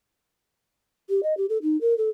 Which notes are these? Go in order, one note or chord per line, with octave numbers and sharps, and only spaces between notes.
G4
D#5
G4
A4
D#4
A#4
A4